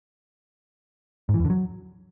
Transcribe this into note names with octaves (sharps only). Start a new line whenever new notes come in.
G#2
E3
E2
D3
F#3